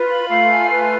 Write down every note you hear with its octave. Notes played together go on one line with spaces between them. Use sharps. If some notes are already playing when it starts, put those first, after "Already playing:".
Already playing: F4 B4
B5
A3 F5
G#5
B4